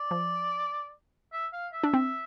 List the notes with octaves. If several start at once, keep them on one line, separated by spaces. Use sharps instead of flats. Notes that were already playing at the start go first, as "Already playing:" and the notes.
Already playing: D5
F3
E5
F5
E5
D4
C4